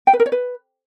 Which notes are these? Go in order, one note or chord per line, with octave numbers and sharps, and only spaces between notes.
G5
B4
A#4
C#5
B4